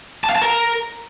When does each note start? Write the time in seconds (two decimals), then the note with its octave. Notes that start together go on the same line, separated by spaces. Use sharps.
0.24 A5
0.30 F5
0.36 A5
0.42 A#4